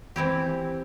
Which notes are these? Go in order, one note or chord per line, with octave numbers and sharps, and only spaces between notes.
E3 C4 E4 G4